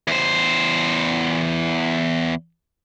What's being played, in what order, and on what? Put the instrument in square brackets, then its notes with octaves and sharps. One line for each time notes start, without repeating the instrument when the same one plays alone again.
[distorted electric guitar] E2 C5